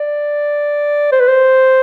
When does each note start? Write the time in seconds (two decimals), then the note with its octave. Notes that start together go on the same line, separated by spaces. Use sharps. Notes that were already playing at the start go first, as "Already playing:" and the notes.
Already playing: D5
1.12 C5
1.20 B4
1.28 C5